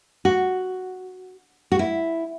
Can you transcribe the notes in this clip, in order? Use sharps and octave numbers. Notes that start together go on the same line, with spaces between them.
F#4
F#4
E4